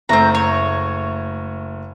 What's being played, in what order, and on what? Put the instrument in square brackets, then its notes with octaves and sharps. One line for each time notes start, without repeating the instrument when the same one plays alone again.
[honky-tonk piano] F#1 A3 C#6 [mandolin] C4 A#5
[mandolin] C#5